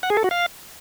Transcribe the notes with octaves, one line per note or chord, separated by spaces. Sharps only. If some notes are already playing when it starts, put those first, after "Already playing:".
F#5
G#4
A4
F#4
F5